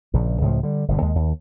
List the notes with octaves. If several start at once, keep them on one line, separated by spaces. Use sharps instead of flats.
A#1 C#3
C#2 A2 F3
D3 G3
G1 B2 D3
D#2 G#3
D#2